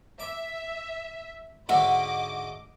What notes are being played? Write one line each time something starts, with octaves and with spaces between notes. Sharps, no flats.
E5 D6
G#2 D3 F#4 D#5 E5 D6